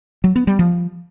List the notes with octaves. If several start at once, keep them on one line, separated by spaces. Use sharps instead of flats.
F#3
B3
G3
F3